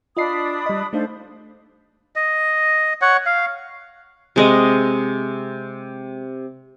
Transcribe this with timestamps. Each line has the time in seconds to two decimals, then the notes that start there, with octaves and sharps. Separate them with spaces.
0.17 D4 F4 D#5 B5 D#6 C7
0.66 G3 D#5
0.93 A3 D4 D#4 A4 C5 F5
2.16 D#5
3.01 C#5 F#5
3.26 F5
4.36 C3 G#3 D#5